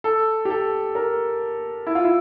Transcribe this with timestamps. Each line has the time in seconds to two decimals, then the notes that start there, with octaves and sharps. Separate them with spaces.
0.04 A4
0.45 G4
0.50 A4
0.95 A#4
1.87 E4
1.95 F4
2.05 E4